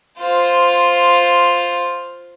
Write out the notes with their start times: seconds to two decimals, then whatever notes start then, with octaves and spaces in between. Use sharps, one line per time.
0.19 F4 C5